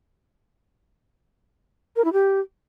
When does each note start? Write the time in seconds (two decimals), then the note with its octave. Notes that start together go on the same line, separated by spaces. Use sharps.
1.96 A#4
2.05 E4
2.13 G4